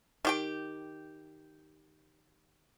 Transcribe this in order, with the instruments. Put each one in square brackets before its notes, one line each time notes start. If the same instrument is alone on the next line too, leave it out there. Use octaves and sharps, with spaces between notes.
[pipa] D#3 G4 G5